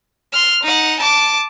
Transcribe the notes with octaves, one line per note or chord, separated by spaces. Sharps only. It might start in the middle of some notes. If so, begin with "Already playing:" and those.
C6 F6
D#4 F#5
A5 D6